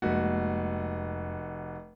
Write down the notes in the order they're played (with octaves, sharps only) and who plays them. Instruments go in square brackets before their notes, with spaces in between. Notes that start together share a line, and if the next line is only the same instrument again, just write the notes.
[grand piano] F1 F#4 [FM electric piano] F2 G#3 A#3